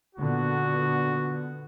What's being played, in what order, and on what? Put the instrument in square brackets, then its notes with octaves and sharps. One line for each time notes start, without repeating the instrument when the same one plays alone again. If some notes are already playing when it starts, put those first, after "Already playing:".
[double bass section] A#2 D3 B3 [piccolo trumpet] F#4